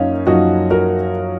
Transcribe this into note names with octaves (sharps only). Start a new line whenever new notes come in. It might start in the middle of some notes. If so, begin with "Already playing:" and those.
Already playing: F#2 A#3 C#4 D#4 F4
F#2 F3 A#3 D#4 F#4
F#4 A#4